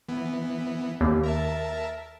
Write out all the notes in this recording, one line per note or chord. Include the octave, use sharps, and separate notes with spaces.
E3 B3
D#2
A#4 E5 A5